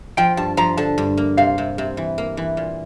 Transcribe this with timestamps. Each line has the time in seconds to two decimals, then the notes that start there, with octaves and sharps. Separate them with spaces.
0.17 F3 G5
0.37 G2 A5
0.57 F3 A#5
0.77 D3 A5
0.98 G2
1.17 A#3
1.37 C3 F5
1.58 C3
1.78 C3
1.97 E3
2.18 A#3
2.37 E3
2.57 A#2